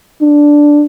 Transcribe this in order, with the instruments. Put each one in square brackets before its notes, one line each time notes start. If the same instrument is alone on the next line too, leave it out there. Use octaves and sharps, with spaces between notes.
[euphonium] D4